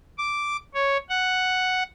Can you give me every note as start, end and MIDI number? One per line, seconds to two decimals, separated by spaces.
0.18 0.57 86
0.74 0.97 73
1.09 1.83 78